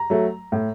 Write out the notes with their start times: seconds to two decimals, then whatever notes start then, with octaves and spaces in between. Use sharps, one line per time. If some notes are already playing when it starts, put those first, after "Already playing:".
Already playing: A#5
0.10 F#3 A3
0.52 A2